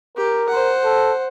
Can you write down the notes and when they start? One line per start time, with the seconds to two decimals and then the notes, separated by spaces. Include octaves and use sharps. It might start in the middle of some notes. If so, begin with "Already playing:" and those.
0.17 G4 A#4
0.49 C5 F#5
0.84 A4